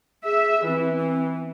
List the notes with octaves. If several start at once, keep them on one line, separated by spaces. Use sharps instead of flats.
G#4 E5
E3 C4
C4